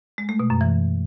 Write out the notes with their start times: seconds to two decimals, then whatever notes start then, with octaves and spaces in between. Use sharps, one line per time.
0.18 G#3
0.29 A3
0.39 B2
0.50 F#2
0.61 E3